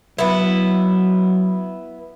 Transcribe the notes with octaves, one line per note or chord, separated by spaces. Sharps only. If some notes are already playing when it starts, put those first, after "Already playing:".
F#3 B3 E4